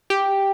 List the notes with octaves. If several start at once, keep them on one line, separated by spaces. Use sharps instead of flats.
G4